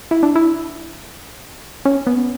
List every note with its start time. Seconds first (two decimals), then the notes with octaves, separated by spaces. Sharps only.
0.11 E4
0.23 D4
0.36 E4
1.85 C#4
2.07 B3